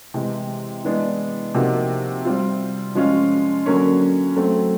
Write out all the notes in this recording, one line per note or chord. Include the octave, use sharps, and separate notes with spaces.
C3 E3 G#3
E3 G#3 B3 D4
C3 F3 A#3 D#4 F#4
G3 C4 F4
F3 G#3 C#4 F4
D3 F#3 A#3 C#4
F#3 A3 C4